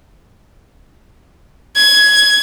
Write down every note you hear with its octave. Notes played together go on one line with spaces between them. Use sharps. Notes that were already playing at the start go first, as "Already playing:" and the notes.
G#6